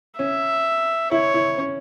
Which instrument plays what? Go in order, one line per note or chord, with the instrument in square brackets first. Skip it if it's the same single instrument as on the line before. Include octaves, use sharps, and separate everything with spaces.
[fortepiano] C#4 [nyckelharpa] E5
[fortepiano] E4 [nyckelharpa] C#5
[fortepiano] E4
C#4